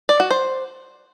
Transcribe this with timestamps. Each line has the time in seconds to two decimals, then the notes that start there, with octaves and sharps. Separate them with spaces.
0.09 D5
0.20 F#4
0.31 C5